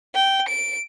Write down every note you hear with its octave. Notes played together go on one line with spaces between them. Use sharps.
G5
D7